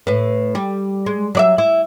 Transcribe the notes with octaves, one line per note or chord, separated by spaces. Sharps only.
A2 B4
G3
G#3
F#3 D5 E5
E4